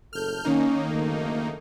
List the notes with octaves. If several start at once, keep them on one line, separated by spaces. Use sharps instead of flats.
F#1 A2 A4 F6 G6
D#3 A#3 C#4 D#4
F#1 D2 A3